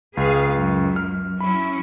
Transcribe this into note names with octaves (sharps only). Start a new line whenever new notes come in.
C#2 G#4 B4 F5
F#2
F6
F#3 C#4 E4 B5